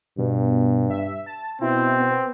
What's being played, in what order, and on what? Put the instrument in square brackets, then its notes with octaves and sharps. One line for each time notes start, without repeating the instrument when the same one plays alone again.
[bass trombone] G2 [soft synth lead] B2
[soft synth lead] E5
A5
[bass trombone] B2 [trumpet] C4 [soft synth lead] E4
[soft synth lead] B3